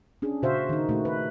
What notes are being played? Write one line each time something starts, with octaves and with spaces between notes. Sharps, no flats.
C#4 D4 G#4
A#2 C#3 F#4 C5 E5 F5
D#3 D#4
A#2 A3 F#4
B4